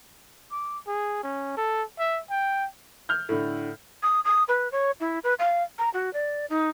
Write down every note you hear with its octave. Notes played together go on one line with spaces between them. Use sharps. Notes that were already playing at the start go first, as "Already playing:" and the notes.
D6
G#4
C#4
A4
E5
G5
F6 G6
A2 D3
D#6
D#6
B4
C#5
E4
B4
F5
A#5
F#4
D5
D#4